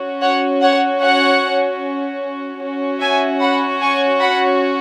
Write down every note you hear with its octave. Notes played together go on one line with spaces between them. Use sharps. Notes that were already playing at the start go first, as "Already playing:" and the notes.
Already playing: C#4 F#4
C#5 F#5
C#5 F#5
C#5 F#5
C#4 F#4
E5 G#5
F#5 B5
G#5 C#6
F#5 B5